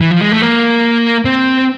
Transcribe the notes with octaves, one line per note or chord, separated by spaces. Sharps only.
E3
F3
G#3
A3
A#3
C4